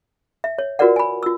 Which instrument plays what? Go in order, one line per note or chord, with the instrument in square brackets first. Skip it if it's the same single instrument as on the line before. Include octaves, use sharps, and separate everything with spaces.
[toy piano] E5
C#5
F4 F#4 A#4 B4 D5 F#5
G#5 B5
F4 E6